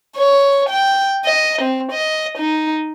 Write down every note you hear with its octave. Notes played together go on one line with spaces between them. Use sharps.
C#5
G5
D#5
C4
D#5
D#4